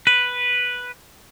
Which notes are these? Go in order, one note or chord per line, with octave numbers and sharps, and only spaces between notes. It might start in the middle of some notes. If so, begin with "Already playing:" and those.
B4